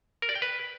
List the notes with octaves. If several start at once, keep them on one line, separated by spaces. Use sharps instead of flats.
A#4
D5
G5
B4